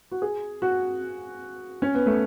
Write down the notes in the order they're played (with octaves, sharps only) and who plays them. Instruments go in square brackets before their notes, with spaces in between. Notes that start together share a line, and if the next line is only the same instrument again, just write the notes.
[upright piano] F#4
G#4
F#4
C#4
B3
A3